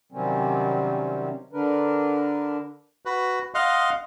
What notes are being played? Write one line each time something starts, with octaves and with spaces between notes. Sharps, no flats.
C3 D#3 F#3 G3 C4 C#4
D3 D4 A#4 B4
F#4 B4
D#5 F5 F#5 C6